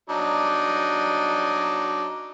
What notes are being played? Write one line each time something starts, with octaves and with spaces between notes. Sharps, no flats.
F#3 D4 D#4